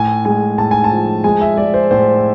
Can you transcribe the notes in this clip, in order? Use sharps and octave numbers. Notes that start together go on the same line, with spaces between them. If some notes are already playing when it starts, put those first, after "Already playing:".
Already playing: A2 G#5
G#3 G#5
A2 A5
G#5
A5
F3
G#3 G#5
E5
G#3 D5
C5
A2 C5